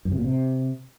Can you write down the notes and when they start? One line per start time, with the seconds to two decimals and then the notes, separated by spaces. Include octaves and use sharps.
0.05 F#2
0.12 C3
0.18 A#2
0.24 C3